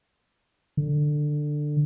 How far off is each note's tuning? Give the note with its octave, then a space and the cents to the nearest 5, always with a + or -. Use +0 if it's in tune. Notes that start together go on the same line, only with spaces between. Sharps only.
D3 +15